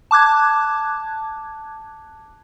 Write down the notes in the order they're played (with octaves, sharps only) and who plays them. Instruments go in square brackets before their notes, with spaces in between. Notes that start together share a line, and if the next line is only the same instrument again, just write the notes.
[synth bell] A5 D6 F#6 G#6